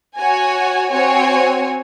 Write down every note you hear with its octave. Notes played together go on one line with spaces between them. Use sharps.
F#4 C#5 G#5
C4 F#4 C#5 G#5